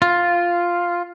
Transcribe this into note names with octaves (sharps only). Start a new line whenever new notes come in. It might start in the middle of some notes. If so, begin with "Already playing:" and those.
F4